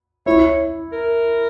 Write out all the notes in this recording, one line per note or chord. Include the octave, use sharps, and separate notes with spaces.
E4 C#5
A#4